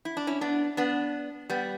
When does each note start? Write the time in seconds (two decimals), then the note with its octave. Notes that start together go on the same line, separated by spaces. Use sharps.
0.05 E4
0.17 D4
0.27 C#4 E4
0.41 B3 D4
0.77 B3 D4
1.50 G3 B3